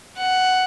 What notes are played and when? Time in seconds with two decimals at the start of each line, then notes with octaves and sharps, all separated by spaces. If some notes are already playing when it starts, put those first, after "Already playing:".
0.17 F#5